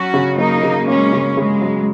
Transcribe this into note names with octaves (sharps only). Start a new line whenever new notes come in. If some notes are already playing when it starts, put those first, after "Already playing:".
Already playing: F#3 C#4 F#4
C#3
F#3 A#3 D#4
C#3
G#3 A#3 C#4
C#3
C#3 G#3
F#3